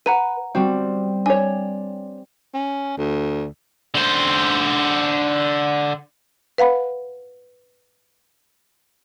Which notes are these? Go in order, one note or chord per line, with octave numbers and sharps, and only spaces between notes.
B4 F#5 A#5 D#7
G3 C4 F#4
D4 C#5 G#5
C#4
D2
D3 C5
B4 F5 F#5 B5